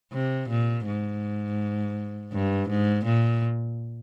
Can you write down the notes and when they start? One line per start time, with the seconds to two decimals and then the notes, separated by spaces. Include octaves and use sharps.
0.13 C3
0.49 A#2
0.86 G#2
2.32 G2
2.69 G#2
3.05 A#2